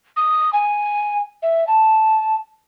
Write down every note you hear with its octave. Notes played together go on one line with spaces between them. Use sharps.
D#6
G#5
E5
A5